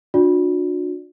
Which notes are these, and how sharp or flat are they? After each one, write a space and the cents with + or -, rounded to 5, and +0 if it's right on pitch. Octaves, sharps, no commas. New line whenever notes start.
D4 +5 F#4 -45 D5 +0